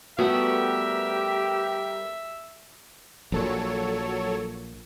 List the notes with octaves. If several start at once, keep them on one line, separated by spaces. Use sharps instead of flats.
G3 A3 B3 F#4 G4 A#4 E5
A#1 A#2 F#3 A4 C#5